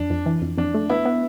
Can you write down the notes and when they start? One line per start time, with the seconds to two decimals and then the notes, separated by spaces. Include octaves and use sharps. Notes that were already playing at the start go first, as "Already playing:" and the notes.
Already playing: F2 D4
0.10 F2
0.26 E3
0.42 F2
0.58 F2 D4
0.75 A3
0.90 B3 E4
1.06 B3